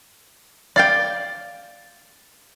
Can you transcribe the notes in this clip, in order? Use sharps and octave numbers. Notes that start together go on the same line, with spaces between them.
D5 F5 G5 A6